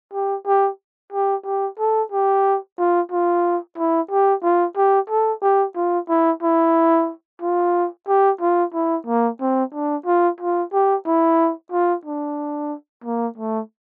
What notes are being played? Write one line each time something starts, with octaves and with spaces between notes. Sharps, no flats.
G4
G4
G4
G4
A4
G4
F4
F4
E4
G4
F4
G4
A4
G4
F4
E4
E4
F4
G4
F4
E4
A#3
C4
D4
F4
F4
G4
E4
F4
D4
A#3
A3